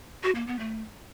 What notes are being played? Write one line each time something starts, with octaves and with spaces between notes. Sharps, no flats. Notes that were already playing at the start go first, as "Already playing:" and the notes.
F#4
A#3
B3
A3